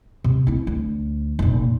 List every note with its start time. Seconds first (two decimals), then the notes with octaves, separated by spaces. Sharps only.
0.24 C3
0.47 C4 E4
0.67 D2
1.39 F1 A#2